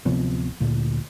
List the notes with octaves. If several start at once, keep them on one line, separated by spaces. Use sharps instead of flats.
D1 C3 F3 B3
D2 A#2